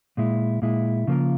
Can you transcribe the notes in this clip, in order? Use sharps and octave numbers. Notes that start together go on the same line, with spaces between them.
A#2 G#3 E4
A#2 G#3 E4
C#3 F3 A#3 F4 A#4